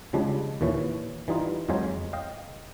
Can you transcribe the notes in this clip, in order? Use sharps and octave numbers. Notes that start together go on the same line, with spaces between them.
C#3 F3 G3 G#3 D4
D#2 A#2 E3 C#5
E3 G3 D#4 F4
F2 F#3 G#3 F4 C5 G#5
D#5 F5 G5